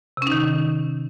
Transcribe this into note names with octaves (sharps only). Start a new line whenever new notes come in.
C3 D#3 C#4 D#4